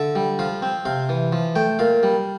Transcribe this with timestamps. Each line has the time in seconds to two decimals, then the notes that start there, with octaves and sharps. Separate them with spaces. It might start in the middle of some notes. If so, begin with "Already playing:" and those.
Already playing: D3 E5
0.15 G3
0.39 F3 F5
0.62 C4
0.85 C3 F5
1.09 E3
1.32 F3
1.56 A3 G5
1.79 A#2 F5
2.03 G3